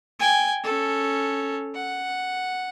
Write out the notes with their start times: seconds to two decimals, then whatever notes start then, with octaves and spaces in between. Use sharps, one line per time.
0.19 G5 G#5
0.64 C#4 A4
1.75 F#5